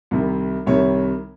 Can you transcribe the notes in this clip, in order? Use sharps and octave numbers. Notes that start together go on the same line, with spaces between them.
C2 C3 D#3
C2 C3 D#3 C#5